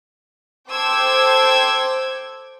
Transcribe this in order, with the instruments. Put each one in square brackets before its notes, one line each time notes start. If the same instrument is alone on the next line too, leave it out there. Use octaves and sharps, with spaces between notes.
[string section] A4 C5 G5 D6 E6 G#6